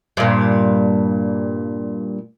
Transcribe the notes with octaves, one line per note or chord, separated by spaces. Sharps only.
G2 A#2